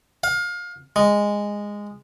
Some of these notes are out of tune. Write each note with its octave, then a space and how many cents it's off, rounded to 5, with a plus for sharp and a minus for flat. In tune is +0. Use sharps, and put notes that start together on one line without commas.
F5 +25
G#3 -10